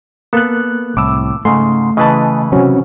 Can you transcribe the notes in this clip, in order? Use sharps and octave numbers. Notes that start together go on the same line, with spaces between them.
A#3 B3 A4 F#6
C2 A2 D6 E6
G#2 C#3 A3 C6
C#3 E3 B4 D#5 A5
C3 F#3 C4 C#4 F#4